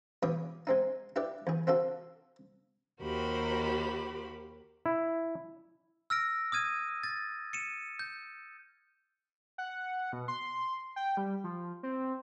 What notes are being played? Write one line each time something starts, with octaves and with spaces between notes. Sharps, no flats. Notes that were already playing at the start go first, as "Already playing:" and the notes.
E2 B2 C#5 D6 D#6
G#3 C4 D#4
E4 G4 B4 D5
E2 G#4
C4 F4 F#4 A4
D#2 F#4 G4 A#4 C5 B5
E4
E6 F6 A#6 D7
D#6 F6 G#6 D#7
A6
C#7 D#7 E7
G6
F#5
B2
C6
G5
G3
F3
C4